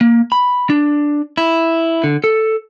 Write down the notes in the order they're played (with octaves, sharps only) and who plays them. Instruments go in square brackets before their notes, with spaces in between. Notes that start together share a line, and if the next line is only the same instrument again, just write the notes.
[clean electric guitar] A#3
B5
D4
E4
D3
A4